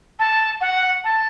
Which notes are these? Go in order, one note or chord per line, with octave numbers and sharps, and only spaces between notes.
A5
F#5
A5